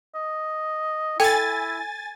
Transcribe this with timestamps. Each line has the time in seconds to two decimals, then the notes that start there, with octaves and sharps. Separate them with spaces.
0.15 D#5
1.20 E4 A4 G5 G#5 A6